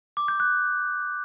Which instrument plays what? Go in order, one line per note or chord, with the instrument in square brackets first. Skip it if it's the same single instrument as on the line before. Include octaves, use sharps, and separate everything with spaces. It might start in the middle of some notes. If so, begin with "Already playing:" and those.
[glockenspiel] D6
G6
F#6